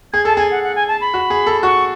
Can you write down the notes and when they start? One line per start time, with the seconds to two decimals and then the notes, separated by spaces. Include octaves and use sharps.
0.13 G#4 G#6
0.25 A4 A5
0.37 G#4 G#5
0.51 F#5
0.63 F#5
0.75 G#5
0.88 A5
1.01 B5
1.14 F#4
1.30 G#4
1.47 A4
1.63 F#4 C#6